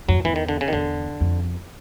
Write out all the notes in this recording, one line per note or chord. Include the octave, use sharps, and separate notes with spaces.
F2 F#3
E2 E3
D#3
D3
C#3
D#3
E2 D3
F2